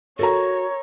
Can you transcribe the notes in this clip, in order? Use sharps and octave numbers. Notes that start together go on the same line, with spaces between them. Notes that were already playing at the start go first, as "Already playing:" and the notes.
F#4 A4 A#4 C#5 A#5